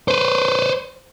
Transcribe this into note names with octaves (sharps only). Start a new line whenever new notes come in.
B4 C5